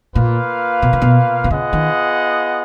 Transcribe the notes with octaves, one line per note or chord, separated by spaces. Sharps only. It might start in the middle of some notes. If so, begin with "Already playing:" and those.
A#2 A#3 F4 B4 F5
B2
C#3
B2
B2
C#3 B3 F4 G#4 D#5 F#5
D#3